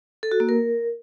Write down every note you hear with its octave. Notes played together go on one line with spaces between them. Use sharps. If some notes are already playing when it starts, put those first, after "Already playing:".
A4
F#4
A#3
A#4